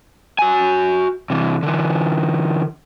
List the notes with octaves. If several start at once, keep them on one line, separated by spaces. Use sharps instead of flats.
F#4 G#5
C3 E3
D3 E3